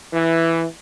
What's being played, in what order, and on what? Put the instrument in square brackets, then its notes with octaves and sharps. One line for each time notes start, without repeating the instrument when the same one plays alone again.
[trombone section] E3